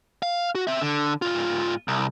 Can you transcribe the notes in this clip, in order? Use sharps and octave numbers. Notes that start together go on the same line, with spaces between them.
F5
F#4
C4 E5
D3
G#2 F4
C2